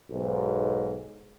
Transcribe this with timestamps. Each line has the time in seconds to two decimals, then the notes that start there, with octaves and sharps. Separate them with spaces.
0.11 B1 G#2